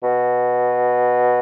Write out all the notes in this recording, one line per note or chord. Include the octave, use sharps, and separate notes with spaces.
B2